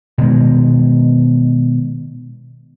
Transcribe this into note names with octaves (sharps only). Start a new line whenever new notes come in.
B2 D#3 G#3